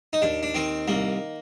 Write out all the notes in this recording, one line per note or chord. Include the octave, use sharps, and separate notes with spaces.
D#4
D#2 D4
D4
D#3 C4
C2 A#3